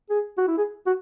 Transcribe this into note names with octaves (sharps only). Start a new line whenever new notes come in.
G#4
F#4
E4
G#4
F#4